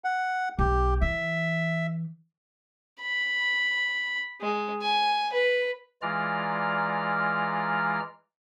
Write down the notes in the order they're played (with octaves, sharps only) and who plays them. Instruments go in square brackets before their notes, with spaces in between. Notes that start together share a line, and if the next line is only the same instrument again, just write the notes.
[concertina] F#5
[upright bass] B1 [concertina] G4
[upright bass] E3 [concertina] E5
[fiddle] B5
G#3
G#5
B4
[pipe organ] E3 G#3 F4 D5 A#5 F6